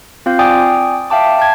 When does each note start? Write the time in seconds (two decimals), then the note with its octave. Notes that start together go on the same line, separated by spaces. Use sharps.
0.26 C4 F4 F5 G6
0.39 D5 G5 G#5 D6 D#6
1.10 E5 F5 G5 A5 D6
1.39 A5 G#6